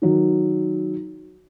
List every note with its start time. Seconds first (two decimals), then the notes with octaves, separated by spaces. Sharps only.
0.02 D#3 F#3